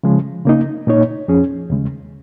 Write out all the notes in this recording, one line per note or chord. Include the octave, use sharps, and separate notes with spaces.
C#3 F3 G#3
C#3 A#3 D#4
A#2 A#3 D#4 C#5
F2 F3 C#4 G#4
D#2 C#3 G#3